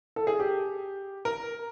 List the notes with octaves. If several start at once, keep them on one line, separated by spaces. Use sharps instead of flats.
A4
G#4
G4
A#4